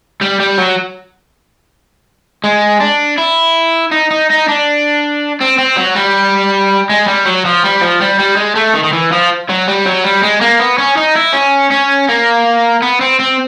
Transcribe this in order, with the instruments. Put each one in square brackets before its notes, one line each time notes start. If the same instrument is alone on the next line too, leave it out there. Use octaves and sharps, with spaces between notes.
[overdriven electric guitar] G3
G3
F#3
G#3
D4
E4
D#4
D#4
D#4
D4
C4
C4
F#3
G3
G#3
G3
F#3
F3
G3
F3
G3
G3
G#3
A3
D#3
D#3
E3
F3
F#3
G3
F#3
G3
G#3
A#3
B3
C#4
D#4
E4
C#4
C#4
A#3
B3
C4
C4